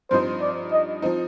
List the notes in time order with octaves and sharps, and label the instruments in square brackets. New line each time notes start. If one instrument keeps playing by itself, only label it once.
[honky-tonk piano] G2 F3 C4 D#4 [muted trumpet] C5
[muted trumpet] D5
D#5
[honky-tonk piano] F3 C4 D#4